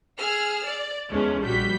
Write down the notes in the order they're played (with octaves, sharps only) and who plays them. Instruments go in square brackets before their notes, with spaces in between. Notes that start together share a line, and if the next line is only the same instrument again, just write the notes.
[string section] G#4 E6 F6
D5
E2 G#3 A3 C#4
A#1 G3 F#4 G6 B6